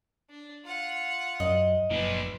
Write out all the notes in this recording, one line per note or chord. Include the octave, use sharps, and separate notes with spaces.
D4
F4 F#5
F#2 D#5
F#1 A#2 D4 B4